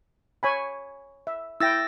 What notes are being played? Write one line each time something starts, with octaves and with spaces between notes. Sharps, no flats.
C#5 G#5 B5
E5
E4 G5 E6 A6 A#6